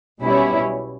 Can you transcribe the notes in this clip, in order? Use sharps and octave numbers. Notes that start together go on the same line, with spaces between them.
B1 B2 G3 C#4 E4